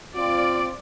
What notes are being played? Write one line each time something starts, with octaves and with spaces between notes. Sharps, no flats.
C4 F4 D5